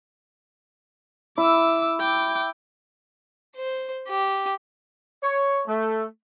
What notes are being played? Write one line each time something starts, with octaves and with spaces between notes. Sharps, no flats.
E4 D6 E6
G5 D6
C5
G4
C#5
A3